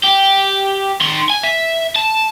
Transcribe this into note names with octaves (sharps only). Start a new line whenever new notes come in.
G4
D#3 C6
G#5
E5
A5